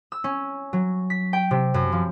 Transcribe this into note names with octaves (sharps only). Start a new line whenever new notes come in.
E6
C#4
F#3
B6
G5
C3
F#2
F3